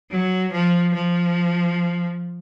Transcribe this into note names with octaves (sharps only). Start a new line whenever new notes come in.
F#3
F3
F3